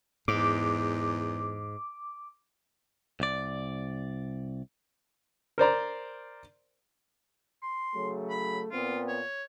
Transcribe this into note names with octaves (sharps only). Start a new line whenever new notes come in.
E2 G#2 D6
C2 D5
A#4 C5 D5 A#5
C6
C#3 F#3 A3
B5
A#2 B3 C4 F4
C#5